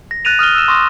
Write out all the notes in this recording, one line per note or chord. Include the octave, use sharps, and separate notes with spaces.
A#6
F#6 A6 A#6 D#7 F7
D#6 F6 D#7 G7
E6 E7
C6 C#6 D#6 A#6